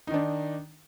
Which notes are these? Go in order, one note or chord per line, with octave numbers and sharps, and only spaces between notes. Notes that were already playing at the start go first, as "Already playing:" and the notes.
D#3 D4 D#4